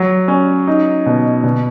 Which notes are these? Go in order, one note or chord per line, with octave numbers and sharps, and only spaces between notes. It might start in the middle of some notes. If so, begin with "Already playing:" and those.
Already playing: F#3
C#4
D#4
B2
B2